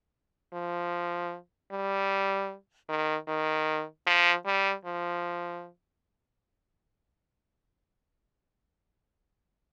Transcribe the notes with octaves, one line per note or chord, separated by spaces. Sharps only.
F3
G3
D#3
D#3
F3
G3
F3